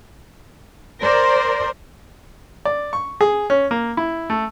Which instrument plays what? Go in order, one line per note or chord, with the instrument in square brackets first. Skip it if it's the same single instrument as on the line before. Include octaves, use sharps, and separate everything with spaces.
[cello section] A#4 C5 D5
[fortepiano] D5
C#6
G#4
C#4
A#3
E4
A3